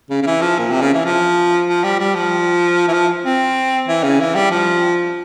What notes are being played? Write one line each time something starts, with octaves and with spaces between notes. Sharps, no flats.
C#3
C#3
E3
F3
A#2
C3
C#3
E3
F3
F3
G3
G3
F3
E3
F3
C4
E3
C#3
E3
G3
F3